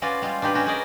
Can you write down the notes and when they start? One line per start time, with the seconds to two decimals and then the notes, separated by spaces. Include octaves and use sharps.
0.02 C#4 F4 F#4 B4 D5
0.22 G3 G#3 F4
0.42 D4 D#4 G4 B4
0.54 C#4 F#4 G4
0.66 F#4 G#4 A#4 B4 D5 D#5